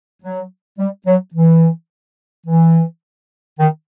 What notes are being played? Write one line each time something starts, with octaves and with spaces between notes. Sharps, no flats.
F#3
G3
F#3
E3
E3
D#3